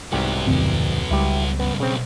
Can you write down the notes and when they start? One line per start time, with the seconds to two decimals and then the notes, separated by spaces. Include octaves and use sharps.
0.12 C2 G#2 F#3 B3 G4
0.47 D1 F2 A2 C#3 E3 C4
1.11 C#2 G3 E4 G4
1.59 G2 C#3 B3
1.80 B1 C#3 C4